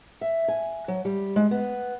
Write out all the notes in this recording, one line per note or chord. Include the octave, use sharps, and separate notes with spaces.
E5
G#5
F#3
G3
G#3
B3